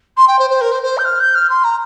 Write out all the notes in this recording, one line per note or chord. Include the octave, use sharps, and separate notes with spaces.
C6
G5
C5
C5
A#4
C5
C5
G6
F6
G6
F6
C6
A#5